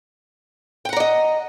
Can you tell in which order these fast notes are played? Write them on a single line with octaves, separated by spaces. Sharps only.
G5 F#5 A#5 D5 D#5